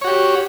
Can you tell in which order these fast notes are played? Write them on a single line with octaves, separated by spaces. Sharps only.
C#5 F#4 G4